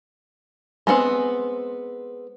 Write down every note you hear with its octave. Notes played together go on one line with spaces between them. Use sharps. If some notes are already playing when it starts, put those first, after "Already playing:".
G#3 A3 B3 C4